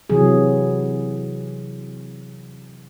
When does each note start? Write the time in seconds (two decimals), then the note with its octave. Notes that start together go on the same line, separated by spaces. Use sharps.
0.10 C3 E3 F#3 G#4